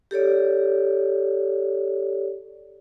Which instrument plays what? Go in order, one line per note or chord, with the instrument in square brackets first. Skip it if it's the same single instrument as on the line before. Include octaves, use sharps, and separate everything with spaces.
[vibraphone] G4 A4 C#5 D5